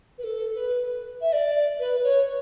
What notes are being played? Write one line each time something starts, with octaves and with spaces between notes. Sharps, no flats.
B4
A4
B4
E5
D5
B4
C#5